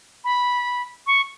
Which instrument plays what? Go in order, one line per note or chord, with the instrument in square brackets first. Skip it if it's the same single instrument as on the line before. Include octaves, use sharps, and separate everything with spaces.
[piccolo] B5
C#6